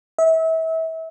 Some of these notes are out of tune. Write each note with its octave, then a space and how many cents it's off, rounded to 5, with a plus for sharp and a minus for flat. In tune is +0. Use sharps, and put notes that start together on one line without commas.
E5 -30